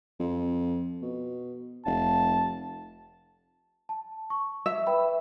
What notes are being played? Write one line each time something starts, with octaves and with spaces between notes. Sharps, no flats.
F2
B2
F1 A5
A5
C#6
E5
B4 G5 B5